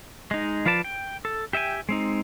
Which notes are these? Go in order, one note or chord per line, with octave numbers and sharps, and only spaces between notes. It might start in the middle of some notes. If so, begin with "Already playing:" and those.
G#3 D#4
F3 F4 B4 D5 A5
G5
A4
G4 E5 G5 G#5
G#3 C4 D#4